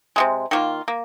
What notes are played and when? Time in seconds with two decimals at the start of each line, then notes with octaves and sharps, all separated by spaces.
0.16 C3 D#3 G#3
0.51 D#3 A#3 F4
0.88 A#3